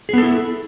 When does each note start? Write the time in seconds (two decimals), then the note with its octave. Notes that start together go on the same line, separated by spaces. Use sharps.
0.09 G#4
0.13 B3
0.18 A4
0.22 E4